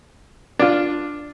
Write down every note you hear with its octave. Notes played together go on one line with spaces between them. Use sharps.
D4 F4